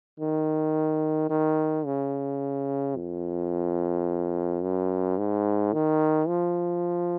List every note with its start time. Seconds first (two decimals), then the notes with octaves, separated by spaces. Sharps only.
0.20 D#3
1.30 D#3
1.86 C#3
2.96 F2
4.62 F#2
5.18 G#2
5.73 D#3
6.28 F3